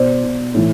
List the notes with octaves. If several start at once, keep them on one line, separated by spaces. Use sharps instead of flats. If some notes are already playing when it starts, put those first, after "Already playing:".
Already playing: B2 C5 D5
B2
A2 E3